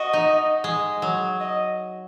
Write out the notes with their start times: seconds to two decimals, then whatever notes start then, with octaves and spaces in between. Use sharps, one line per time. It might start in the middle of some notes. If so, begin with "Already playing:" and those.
Already playing: F#4 D#5
0.13 D#4
0.64 G#3
1.02 F#3
1.40 D#5